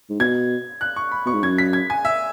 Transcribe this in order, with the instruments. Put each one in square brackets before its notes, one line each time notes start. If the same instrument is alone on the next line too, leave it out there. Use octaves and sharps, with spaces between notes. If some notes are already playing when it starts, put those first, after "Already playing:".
[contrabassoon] G#2
[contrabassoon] B2 [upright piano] G#6
[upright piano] F#6
C#6
B5
[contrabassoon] B2 [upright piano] C#6
[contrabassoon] G#2
[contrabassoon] F#2 [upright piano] G#6
[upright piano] B6
G#6
G#5
E5